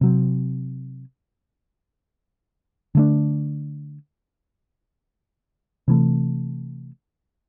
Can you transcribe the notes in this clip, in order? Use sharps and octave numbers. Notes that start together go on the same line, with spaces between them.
C3 F#3 C4
D3 A3 D4
C3 E3 A3